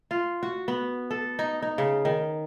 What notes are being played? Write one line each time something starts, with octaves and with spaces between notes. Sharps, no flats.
F4
F#4
B3
A4
D#4
D#4
C#3
D#3